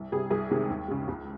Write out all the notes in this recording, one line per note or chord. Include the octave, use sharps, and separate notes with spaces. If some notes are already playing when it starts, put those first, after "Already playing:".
Already playing: C2
C3 G3 G#4
C2 G#4
C3 D#3 G#3
D#2
C#3 G#3
C#2